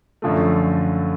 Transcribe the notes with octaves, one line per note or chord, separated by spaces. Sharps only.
F#2 D3 F3 A3